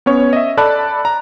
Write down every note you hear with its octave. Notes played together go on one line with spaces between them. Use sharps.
B3 C#4 C#5
D#5 E5
A4 D5 A5 B5 F#6
A#5